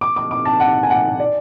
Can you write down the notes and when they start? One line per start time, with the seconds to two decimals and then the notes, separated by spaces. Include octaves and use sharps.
0.01 D6
0.16 D6
0.31 D6
0.45 A5
0.60 F#5
0.83 G#5
0.90 F#5
1.20 D5